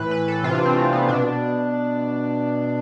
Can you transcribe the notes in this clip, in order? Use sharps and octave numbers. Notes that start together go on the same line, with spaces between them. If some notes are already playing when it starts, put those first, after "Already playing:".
Already playing: A2 E3 B4
B4
A4
C3 E3 F4
D4
C4
A3
B3
B2 D4